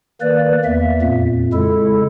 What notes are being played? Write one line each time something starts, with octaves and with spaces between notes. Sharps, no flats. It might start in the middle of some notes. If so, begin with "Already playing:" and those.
D#3 A#3 B4 D5
E2 A#3 E5
F2 A#2
C#3 G#3 E4 A4